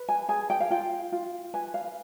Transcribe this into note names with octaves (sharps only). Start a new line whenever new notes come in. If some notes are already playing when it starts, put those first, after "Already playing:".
Already playing: B4
G#5
G#4 G#5
G5
F5
F4 G5
F4
B4 G#5
F5